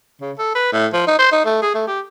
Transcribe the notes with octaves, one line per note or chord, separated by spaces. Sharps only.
C#3
A4
B4
A2
F3
D#4
C5
D#4
A3
G#4
A3
G4